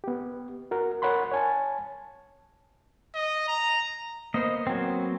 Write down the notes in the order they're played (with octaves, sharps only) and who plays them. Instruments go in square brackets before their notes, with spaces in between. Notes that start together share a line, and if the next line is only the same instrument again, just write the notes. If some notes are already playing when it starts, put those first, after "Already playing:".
[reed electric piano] B3 G4
F#4 A#4
A#4 C#5 F#5 B5 C6
C#5 G#5 A5
[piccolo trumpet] D#5
A#5
[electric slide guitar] A#3 B3 C5 [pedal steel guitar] D#5
[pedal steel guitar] F#3 C4